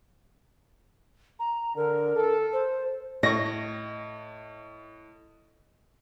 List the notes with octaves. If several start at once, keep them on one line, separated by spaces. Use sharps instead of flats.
A#5
D3 A#4
A4
C5
A2 D#5 C#6 A#6